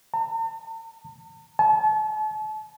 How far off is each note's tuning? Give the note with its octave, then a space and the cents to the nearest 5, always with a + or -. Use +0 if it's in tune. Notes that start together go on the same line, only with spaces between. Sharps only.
A5 +45
A5 -40